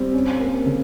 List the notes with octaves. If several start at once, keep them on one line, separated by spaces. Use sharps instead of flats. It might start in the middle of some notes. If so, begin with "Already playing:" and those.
Already playing: G3 C4 G4
C#4
A#3
C#3